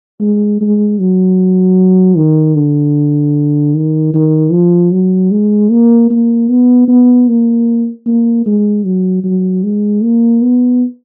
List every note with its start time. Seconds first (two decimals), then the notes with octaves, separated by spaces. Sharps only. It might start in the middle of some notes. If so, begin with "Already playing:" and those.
0.20 G#3
0.61 G#3
0.99 F#3
2.17 D#3
2.56 D3
3.75 D#3
4.14 D#3
4.52 F3
4.92 F#3
5.31 G#3
5.70 A#3
6.10 A#3
6.49 B3
6.88 B3
7.28 A#3
8.06 A#3
8.46 G#3
8.85 F#3
9.24 F#3
9.63 G#3
10.02 A#3
10.42 B3